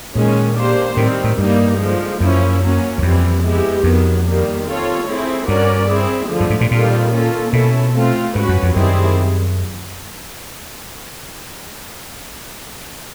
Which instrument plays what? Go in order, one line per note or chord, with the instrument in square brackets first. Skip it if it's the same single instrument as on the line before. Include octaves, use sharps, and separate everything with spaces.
[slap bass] A#2 [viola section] D#3 G#3 C#4
[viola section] A#3 D4 G4 C5
[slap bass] A2 [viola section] D#3 G3 C4
[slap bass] A2
[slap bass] G2 [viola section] G3 A#3 D#4
[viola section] D3 F3 G#3
[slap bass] F#2 [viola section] F3 A#3 C#4 E4
[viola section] F#3 A#3 C#4
[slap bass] E2
[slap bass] F2 [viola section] E3 G3 C4
[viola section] G#3 B3 E4 G4
[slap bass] F2 [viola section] D#3 F#3 B3
[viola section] D#3 G3 A#3
C4 F4 A4 C#5
A3 C4 E4 G#4
[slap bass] G2 [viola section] C#4 F#4 A#4 D5
[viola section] C4 E4 G#4
D3 F3 A3
[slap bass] G2
G#2
A#2
[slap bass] A#2 [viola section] D#3 G3 C4 F4 A4
[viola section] A#3 C#4 F4 A4
[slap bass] B2 [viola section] C#4 E4 A4
[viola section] A3 C4 F4
[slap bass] G#2 [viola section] C#4 F#4 B4
[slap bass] F#2
F2
[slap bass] F#2 [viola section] D#3 G3 C4 E4 G#4